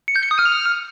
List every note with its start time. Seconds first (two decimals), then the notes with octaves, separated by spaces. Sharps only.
0.08 C#7
0.16 G6
0.23 C#7
0.31 D#6
0.39 F6